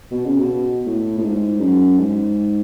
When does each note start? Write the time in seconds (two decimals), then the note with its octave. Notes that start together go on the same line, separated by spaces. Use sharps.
0.11 B2
0.25 C#3
0.39 B2
0.86 A2
1.18 A2
1.23 G#2
1.60 F#2
1.98 G#2